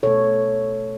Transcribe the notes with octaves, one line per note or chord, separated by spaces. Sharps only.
B2 A3 A4 C#5